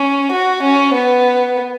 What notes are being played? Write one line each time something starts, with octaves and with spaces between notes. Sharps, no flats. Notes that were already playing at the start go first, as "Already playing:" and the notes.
Already playing: C#4
F#4
C#4
B3